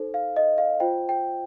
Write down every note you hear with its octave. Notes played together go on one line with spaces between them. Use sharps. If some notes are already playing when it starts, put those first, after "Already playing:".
Already playing: D#4 A4 C5
F5
D#5
F5
F4 C5 G5
G5